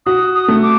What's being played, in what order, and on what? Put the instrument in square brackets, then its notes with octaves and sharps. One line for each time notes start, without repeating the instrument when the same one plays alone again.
[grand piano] F#4 [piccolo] D#6
[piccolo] D#6
[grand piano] A3
[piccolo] D6